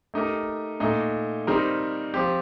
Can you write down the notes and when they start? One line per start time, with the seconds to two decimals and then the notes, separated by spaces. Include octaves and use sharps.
0.14 A3 D#4 G4 A#4
0.80 A#2 A3 D#4
1.47 D#3 G3 C4 D#4 A#4
2.14 F3 C4 G4